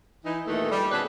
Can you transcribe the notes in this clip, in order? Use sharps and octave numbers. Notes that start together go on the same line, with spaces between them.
E3 D#4
D#2 A#2 D#3 E3 A3 A4
G3
B2 A3 C#4 G#4 B4